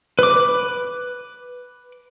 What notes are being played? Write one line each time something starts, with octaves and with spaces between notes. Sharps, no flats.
B4 D6